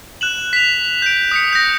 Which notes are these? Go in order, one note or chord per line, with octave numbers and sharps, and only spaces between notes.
F#6 E7 F#7
B6 F7
G6 D7
D#6 B6 C#7
G6 A#6